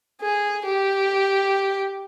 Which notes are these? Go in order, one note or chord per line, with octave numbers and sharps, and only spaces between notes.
G#4
G4